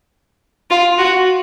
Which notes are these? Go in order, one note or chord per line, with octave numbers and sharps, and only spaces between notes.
F4
F#4